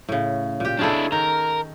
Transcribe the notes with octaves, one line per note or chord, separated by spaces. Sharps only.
A2 C#3
A#2 G4
C#4 D4 E4 G#4 A4
D#3 A#4